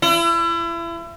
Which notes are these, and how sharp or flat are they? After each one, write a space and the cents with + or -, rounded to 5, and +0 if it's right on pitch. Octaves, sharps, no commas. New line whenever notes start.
E4 +35